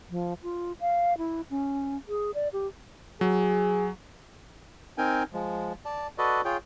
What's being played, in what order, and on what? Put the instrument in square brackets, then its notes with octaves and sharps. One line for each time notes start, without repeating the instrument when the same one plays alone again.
[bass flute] F3
F4
F5
E4
C#4
G#4
D5
G4
[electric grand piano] F#3 [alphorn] G#4
[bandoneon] C4 D#4 A#4 G5 G#5
F3 G#3
D5 A5
F#4 A4 B4 D5 D#5
F4 G#4 C#5 G5